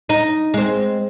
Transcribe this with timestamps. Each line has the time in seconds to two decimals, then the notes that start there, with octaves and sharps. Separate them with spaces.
0.09 D#4
0.54 G#3 C4